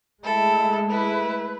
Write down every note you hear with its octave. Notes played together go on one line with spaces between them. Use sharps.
G#3 A3 E4 A4
E4 B4